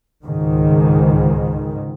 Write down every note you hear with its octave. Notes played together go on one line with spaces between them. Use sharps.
C#2 G#2 D#3